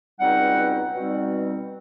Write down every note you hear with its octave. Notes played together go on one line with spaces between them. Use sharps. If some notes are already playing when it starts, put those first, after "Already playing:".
C#2 B2 G3 C4 D#4 F#5
B2 G3 C4 D#4